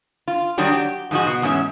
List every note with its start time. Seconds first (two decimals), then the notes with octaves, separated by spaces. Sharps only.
0.28 F4
0.58 D#3 F#3 G3 D4
0.72 G4
1.11 G#2 F3 G#3 F#4
1.27 B2
1.42 E2 G#2 C#4 E5